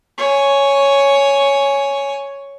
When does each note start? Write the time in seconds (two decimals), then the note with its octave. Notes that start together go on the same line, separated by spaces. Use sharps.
0.18 C#5 G#5